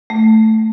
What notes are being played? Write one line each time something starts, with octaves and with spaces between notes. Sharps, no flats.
A3